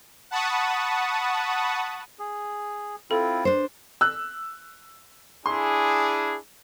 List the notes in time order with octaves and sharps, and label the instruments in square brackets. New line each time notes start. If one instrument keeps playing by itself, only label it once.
[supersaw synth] F#5 A5 B5 C#6 D#6
[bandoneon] G#4
[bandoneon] C4 E4 F4 [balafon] A4
[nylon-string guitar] D4 C5
[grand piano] E6 F#6
[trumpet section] D4 E4 G#4 [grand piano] C6